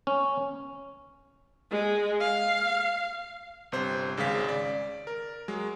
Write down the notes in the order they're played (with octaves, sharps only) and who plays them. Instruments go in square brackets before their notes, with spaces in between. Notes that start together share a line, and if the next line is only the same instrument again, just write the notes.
[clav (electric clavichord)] C#4
[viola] G#3
F5
[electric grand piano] G1 C3 C5
G#1 C#3 G#3 F5 B6
D5
A#4
F#3 G#3